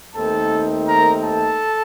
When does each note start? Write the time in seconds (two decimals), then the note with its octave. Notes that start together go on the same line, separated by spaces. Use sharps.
0.14 D#2 D#3 A3 C4 D#4 A4 A5
0.87 A#4 A#5
1.22 A4 A5